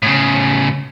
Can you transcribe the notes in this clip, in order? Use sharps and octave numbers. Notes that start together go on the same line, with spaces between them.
A2 C#3